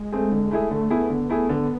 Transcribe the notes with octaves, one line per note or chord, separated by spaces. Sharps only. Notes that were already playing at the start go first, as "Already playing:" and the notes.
Already playing: G#3
A3 C4 G#4
D3
A3 E4 G#4
D3 A3
A3 B3 E4 G#4
D3
A3 E4 G#4
D3